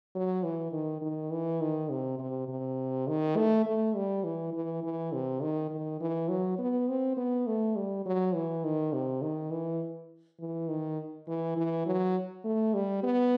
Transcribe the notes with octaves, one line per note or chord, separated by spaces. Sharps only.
F#3
E3
D#3
D#3
E3
D#3
C3
C3
C3
D#3
A3
A3
G3
E3
E3
E3
C3
D#3
D#3
E3
F#3
B3
C4
B3
A3
G3
F#3
E3
D#3
C3
D#3
E3
E3
D#3
E3
E3
F#3
A3
G3
B3